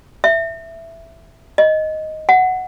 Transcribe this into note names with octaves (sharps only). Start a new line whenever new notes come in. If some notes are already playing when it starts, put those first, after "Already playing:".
E5
D#5
F#5